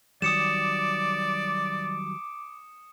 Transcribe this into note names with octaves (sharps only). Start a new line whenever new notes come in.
D#3 F#3 G3 D5 D6 D#6 C#7 E7